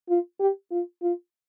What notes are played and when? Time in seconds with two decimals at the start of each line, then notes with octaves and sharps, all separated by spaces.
0.09 F4
0.40 G4
0.71 F4
1.02 F4